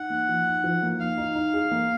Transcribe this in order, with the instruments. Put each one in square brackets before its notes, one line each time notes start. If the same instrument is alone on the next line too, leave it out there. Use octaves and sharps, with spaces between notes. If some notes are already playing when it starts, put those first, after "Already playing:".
Already playing: [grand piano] D#4 [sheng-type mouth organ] F#5
[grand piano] A#3
F3
D#4
F3
A#3
[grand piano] D#4 [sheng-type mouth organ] F5
[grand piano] D#4
D#4
G#4
A#3